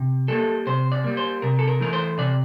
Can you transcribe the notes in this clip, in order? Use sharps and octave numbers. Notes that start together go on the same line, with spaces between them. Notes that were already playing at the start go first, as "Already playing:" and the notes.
Already playing: C3
G3 A#3 A4
C3 C5
D5
G3 A#3
C5
C3 A#4
A4
A#4
E3 A3 A#4
C5
C3 D5